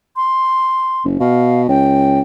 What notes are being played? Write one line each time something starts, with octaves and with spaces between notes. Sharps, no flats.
C6
F#1
B2 F5
C#2 G5